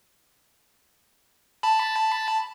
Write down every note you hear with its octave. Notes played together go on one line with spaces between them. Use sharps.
A5 B5